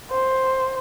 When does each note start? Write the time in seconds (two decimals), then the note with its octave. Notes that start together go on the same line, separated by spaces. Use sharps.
0.11 C5